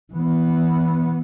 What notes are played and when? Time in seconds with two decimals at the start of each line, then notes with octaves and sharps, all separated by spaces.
0.13 E3 B3